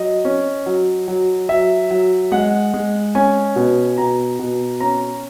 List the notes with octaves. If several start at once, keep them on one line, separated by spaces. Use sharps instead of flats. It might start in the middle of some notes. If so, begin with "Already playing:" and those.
Already playing: F#3 D#5
C#4
F#3
F#3
F#3 E5
F#3
G#3 F#5
G#3
C#4 G#5
B2
B2 A#5
B2
C#4 A#5